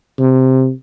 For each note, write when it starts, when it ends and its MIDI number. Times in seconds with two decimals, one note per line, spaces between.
0.19 0.71 48